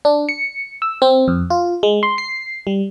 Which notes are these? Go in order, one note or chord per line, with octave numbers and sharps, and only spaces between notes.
D4
C#7
E6
C4
F2
F4
G#3
C6
C7
G3